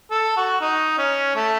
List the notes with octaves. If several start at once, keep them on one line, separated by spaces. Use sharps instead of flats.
A4
F#4
D#4
C#4
A3